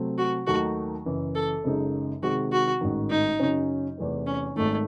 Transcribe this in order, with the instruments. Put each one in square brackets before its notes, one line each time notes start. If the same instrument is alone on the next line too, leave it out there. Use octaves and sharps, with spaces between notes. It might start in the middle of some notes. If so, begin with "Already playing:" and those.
Already playing: [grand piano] C3 F#3 A3 C4
[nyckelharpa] F#4
[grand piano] D#2 D#3 F#3 A3 D#4 [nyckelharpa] F#4
[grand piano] F#1 F#2 E3
[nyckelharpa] A4
[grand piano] F#1 F#2 C#3 G#3 D#4
[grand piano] C3 D#3 G#3 C4 [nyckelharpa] F#4
[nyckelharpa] F#4
[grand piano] A1 G#2 D#3
[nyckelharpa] D#4
[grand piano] F#2 C#3 F#3 C#4
E2 C3 E3 A3 C4
[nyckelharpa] C#4
[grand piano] G#1 G#2 D#3 [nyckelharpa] A3